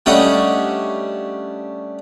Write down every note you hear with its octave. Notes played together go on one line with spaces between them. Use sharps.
G3 A3 C#4 D4 D#5 F#5